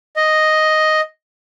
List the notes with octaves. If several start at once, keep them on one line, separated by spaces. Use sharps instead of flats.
D#5